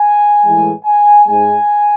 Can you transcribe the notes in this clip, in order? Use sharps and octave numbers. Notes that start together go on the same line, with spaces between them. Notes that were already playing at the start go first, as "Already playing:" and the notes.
Already playing: G#5
A2 E3 G#3
G#5
G#2 G#3 G#5